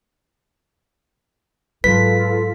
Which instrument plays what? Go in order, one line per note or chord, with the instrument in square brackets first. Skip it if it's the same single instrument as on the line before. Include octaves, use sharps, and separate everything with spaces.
[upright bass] G#2 F#3 [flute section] F4 A4 [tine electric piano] B4 [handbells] B6